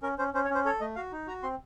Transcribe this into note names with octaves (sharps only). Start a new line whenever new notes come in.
C#4 A#4
C#4 C5
C#4 C5
C#5
C#4 C5
A4 C#5
A3 D#5
F#4 F5
D#4
F#4 A#5
C4 C6